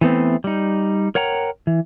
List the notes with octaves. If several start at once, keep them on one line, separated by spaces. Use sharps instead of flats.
E3 A3 B3 C4
G3 D#4
A#4 C#5 F#5 G5 A#5
E3